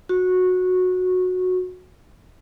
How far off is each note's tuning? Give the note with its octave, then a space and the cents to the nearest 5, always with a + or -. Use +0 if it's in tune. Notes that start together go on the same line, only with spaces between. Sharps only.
F#4 -15 C#6 -20